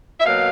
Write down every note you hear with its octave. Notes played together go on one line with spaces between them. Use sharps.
E5
B2 F#3 A#3 F5